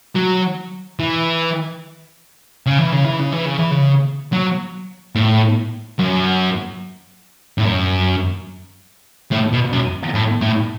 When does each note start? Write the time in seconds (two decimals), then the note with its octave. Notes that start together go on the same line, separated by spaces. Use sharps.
0.16 F#3
0.99 E3
2.66 C#3
2.79 E3
2.93 C#3
3.05 E3
3.19 C#3
3.32 E3
3.45 C#3
3.59 E3
3.71 C#3
4.33 F#3
5.15 A2
5.99 F#2
7.58 A2
7.65 F#2
9.32 A2
9.53 B2
9.73 F#2
10.15 A2
10.42 A2